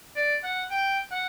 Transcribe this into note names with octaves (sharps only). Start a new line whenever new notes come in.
D5
F#5
G5
F#5